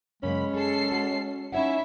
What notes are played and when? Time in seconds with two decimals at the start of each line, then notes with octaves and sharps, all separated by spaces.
0.23 F#2 C#3 G#3 A#3 C#4 B5
0.54 G#4 A4 C7
0.92 F#4
1.52 C#4 D#4 E4 C#5 E5 F#5